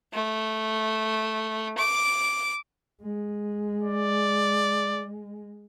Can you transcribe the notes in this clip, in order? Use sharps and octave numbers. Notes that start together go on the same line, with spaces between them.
A3
D6
G#3
D5